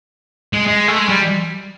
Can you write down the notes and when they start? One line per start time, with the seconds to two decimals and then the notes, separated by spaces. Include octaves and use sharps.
0.53 G#3
0.67 G#3
0.88 A3
0.99 G#3
1.09 G3